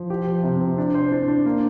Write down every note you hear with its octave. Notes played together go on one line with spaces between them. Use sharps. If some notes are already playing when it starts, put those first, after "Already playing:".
Already playing: F3
G4
F3
C3
C4
D4
C5
D4
D4
A#3